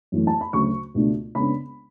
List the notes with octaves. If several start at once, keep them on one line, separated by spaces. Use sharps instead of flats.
F#2 E3 A3
A5
B5
D2 C#3 F#3 A3 C#6
C#2 B2 A3 D4
C#3 G#3 B3 D4 B5